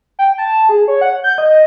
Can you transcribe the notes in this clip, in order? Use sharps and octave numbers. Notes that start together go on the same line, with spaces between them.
G5
A5
G#4
C#5
F#5
G6
D#5